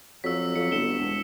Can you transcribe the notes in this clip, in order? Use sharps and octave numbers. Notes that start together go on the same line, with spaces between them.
F2 F#3 E6 B6
F2 C#7
G1 C#7 E7 G7
E1 E7